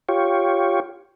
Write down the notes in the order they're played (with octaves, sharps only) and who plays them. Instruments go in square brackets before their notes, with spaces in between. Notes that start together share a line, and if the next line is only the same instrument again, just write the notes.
[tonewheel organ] F4 G4 C#5